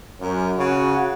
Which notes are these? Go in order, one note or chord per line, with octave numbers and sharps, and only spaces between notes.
F#2
C#3 F#4